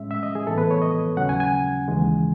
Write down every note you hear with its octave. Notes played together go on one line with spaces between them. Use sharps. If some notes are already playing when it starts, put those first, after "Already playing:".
Already playing: A2 G#3 C#4 E5
E5
D#5
G#4
A2 E3 B3 A4
B4
C#5
D#5
D#2 C#3 F#3 C#4 F#5
G#5
G#5
D#2 C#3 E3 G#3